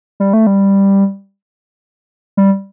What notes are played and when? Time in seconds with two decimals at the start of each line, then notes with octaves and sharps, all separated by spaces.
0.20 G3
0.33 A3
0.47 G3
2.37 G3